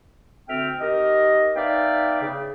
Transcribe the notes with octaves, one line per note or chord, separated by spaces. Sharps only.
D2 D3 C4 E5 G5 F6
D#3 G4 A#4 D#5
B3 D#4 D5 E5 F5 G5
C#3